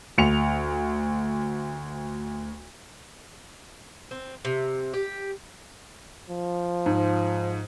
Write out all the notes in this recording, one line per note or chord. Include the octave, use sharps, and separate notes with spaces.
D2 C#7 F7
C4
C3
G4
F3
G#2